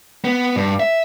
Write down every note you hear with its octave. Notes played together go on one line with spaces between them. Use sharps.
B3
G2
E5